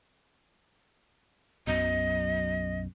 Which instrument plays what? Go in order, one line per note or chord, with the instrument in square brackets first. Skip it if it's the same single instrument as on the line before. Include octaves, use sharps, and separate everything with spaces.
[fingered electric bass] B1 F#2 B2 [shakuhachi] D#5